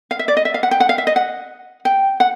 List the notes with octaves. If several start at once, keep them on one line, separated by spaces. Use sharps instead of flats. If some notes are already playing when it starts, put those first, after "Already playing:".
F5
E5
D5
D#5
E5
F5
F#5
G5
F#5
F5
E5
D#5
F#5
G5
F#5